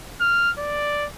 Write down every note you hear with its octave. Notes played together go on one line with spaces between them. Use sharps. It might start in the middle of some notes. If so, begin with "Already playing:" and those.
F6
D5